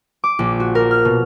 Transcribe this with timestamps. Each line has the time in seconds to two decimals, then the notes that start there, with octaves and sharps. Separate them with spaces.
0.24 D6
0.39 A#1
0.60 F#4
0.75 A#4
0.91 F6
1.05 B2